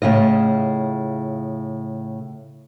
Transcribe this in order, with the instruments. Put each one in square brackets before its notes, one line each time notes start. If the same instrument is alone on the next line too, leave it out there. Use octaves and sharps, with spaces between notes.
[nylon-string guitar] A2 C#3 F4 D#5